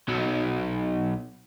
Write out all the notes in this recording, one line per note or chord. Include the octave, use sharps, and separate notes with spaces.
B1 F#3